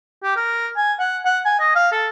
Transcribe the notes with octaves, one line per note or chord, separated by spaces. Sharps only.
G4
A#4
G#5
F#5
F#5
G#5
D#5
F5
A4